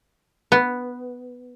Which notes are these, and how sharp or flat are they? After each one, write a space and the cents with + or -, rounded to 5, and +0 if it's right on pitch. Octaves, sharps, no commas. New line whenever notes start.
B3 +0